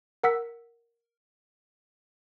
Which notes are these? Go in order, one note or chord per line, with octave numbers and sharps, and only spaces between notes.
A#4 F#5 E6 B6